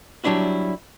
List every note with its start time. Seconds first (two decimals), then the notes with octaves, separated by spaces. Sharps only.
0.24 F#3 G3 D4 E4 F#4